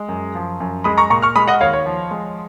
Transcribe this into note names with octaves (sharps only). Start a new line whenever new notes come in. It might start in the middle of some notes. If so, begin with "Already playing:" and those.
Already playing: G#3
F#2
F3
F#2
G#3 B5 D#6
A#5 C#6
A#2 A#5 C#6
C#6 F6
G#3 B5 D#6
D#5 F#5
D#2 C#5 F5
C#5
F3
G#3